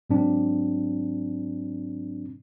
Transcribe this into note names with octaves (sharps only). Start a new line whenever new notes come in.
G#2 F#3 C4 D4